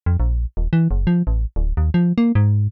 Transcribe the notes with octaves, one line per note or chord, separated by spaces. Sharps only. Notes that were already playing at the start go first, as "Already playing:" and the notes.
F2
A#1
D#1
E3
F#1
F3
A1
D1
D#2
F3
A#3
G#2